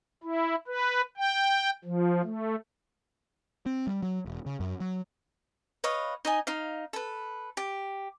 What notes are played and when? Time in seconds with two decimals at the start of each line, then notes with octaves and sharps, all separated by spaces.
0.23 E4
0.68 B4
1.17 G5
1.85 F3
2.23 A3
3.66 C4
3.87 G3
4.03 F#3
4.25 E1
4.46 C#3
4.60 F#2
4.80 F#3
5.84 B4 C#5 D#5 F5
6.25 D#4 D#5 G#5
6.47 D#4 F5
6.93 A4 B4
7.57 G4